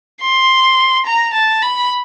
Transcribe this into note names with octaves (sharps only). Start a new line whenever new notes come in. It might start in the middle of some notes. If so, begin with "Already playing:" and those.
C6
A#5
A5
B5